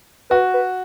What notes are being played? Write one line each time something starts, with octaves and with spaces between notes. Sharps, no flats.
F#4 B4
B4